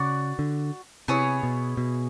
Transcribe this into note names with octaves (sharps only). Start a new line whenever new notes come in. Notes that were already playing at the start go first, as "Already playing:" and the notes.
Already playing: C#3 F#4 D5 F#5
D3
C3 B3 E4 G#4 C#5
B2
B2